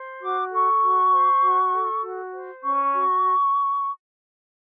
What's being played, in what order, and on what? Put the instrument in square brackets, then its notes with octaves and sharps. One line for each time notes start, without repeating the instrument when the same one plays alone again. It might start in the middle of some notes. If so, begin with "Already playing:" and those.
Already playing: [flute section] C5
F#4 D6
A4 C#6
F#4
C5
F#4
A4
F#4
C5
C#4 C#6
F#4